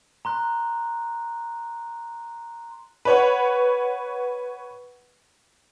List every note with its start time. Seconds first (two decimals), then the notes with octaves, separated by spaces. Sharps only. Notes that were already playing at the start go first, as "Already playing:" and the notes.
0.25 A#5 C6 F#6
3.05 B4 C#5 F#5